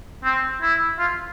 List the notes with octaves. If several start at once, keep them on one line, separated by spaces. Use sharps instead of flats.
C4
E4
F4